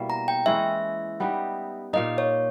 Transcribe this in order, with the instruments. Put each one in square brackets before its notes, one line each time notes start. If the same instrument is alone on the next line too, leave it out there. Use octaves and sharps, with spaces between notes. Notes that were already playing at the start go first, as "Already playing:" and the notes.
Already playing: [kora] B2 G3 A#3 E4
[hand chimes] A#5
G5
[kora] E3 G#3 C#4 E4 [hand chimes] E5
[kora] G3 B3 D#4 G4
[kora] A#2 A#3 D#4 [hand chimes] D#5
[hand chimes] C#5